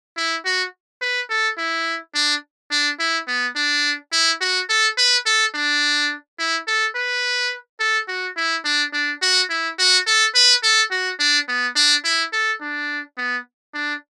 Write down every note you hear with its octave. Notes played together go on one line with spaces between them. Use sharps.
E4
F#4
B4
A4
E4
D4
D4
E4
B3
D4
E4
F#4
A4
B4
A4
D4
E4
A4
B4
A4
F#4
E4
D4
D4
F#4
E4
F#4
A4
B4
A4
F#4
D4
B3
D4
E4
A4
D4
B3
D4